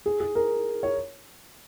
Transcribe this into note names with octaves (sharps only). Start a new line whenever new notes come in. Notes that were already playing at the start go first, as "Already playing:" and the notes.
G#4
G#4
A#4
C#5